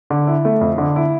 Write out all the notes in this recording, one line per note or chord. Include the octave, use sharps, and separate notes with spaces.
D3
E4
A3
F2
D3
E4